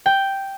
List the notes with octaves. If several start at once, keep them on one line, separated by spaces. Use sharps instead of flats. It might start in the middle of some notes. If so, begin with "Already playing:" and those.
G5